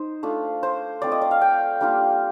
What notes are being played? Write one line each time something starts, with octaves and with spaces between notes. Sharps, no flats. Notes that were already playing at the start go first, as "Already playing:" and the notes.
Already playing: D#4 C5
A3 D4 F4
C5
A3 C4 F4 D5
D#5
D5
F5
G5
G3 A#3 D4 F4